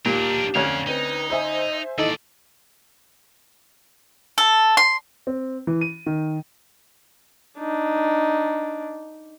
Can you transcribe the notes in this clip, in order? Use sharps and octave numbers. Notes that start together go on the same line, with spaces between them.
D#2 A#2 D4 G4 A#4
D2 C4 C#4 F5
C4 D#4 B4
C5 D#5 E5 G#5
D#2 E3 D#4 A4 D5 D#5
A4
C6
C4
E3
D#7
D#3
D4 D#4